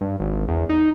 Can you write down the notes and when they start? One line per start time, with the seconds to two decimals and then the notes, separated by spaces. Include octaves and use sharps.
0.01 G2
0.20 G#1
0.48 E2
0.69 D#4